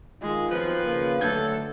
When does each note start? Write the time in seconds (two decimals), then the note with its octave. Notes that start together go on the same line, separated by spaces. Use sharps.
0.22 D#3 G#3 F4
0.51 B2 D#3 F3 F#3 B3 C4 B4
0.84 C#3 A#3
1.21 D3 F#3 A3 A4 G6 G#6